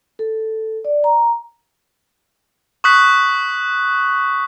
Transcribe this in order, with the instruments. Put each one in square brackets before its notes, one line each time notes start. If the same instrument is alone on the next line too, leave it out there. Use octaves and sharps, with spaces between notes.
[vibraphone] A4
D5
A#5
[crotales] C#6 D#6 F#6 B6